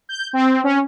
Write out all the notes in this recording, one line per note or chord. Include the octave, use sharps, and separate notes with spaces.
G6
C4
C#4